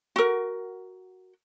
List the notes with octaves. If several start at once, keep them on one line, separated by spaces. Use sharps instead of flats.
F#4 A#4